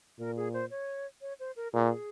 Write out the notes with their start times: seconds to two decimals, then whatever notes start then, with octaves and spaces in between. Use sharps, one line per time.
0.19 A#2 A#4
0.37 G#4
0.53 C5
0.71 C#5
1.21 C#5
1.40 C5
1.56 A#4
1.73 A#2 G#4